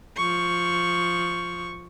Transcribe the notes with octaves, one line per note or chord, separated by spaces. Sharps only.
F3 C#6